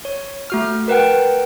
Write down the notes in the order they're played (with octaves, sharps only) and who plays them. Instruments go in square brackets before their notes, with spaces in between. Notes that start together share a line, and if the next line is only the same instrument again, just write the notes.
[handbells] C#5
A3 F#4 F6
A#4 B4 F#5 G5